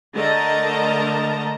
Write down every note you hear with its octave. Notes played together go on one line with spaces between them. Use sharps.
D3 A3 A#4 D#5 A5 A#5